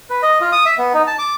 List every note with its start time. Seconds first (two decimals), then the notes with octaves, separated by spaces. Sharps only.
0.10 B4
0.22 D#5
0.41 F4
0.52 D#6
0.66 E5
0.78 B3
0.94 D#4
1.07 A5
1.19 D6